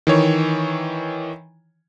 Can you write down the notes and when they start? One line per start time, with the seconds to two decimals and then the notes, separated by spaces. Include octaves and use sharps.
0.07 D#3 E3 C#5